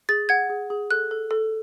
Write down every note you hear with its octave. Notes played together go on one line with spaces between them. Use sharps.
G#4 A6
F#5 G#6
G#4
G#4
A4 F#6
A4
A4